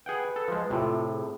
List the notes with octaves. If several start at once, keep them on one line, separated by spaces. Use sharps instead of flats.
G#4 B4 F#5 G5
A4
F3 G#3
A2 C3 F4
G#4